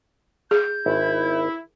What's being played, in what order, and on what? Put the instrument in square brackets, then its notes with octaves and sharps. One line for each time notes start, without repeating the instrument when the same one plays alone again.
[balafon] G#4 [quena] G6
[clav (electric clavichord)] G#1 [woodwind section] E4